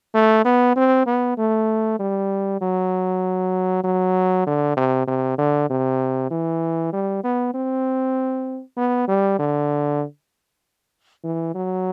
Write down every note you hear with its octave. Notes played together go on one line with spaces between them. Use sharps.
A3
B3
C4
B3
A3
G3
F#3
F#3
D3
C3
C3
D3
C3
E3
G3
B3
C4
B3
G3
D3
E3
F#3